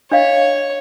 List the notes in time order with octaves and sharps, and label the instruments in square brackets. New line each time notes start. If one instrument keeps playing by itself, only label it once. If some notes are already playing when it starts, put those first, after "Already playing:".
[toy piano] D4 D#5 F5 [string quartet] C#5